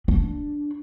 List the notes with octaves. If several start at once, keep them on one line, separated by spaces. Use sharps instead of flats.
D4